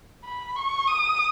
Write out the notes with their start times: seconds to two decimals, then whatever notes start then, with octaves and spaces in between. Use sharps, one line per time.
0.25 B5
0.56 C#6
0.88 D#6